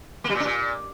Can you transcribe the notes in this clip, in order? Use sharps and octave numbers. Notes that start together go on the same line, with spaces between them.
A#3
G3
A#2
D4
A#2